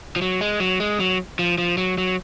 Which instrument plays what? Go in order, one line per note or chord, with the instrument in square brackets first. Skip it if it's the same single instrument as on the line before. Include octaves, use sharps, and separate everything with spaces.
[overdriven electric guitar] F3
F#3
G#3
F#3
G#3
F#3
F3
F3
F#3
F#3